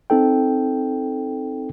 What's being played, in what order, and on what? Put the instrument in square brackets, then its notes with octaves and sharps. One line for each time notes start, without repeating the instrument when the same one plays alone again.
[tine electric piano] C4 D#4 A4 G5